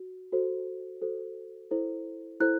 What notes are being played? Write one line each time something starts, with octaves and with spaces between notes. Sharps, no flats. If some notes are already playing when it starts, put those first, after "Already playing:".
Already playing: F#4
F#4 A4 C5
F#4 A4 C5
E4 A4 C5
E4 A4 C5 F#6